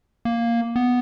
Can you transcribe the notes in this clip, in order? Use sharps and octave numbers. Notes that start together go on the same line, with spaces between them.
A#3
B3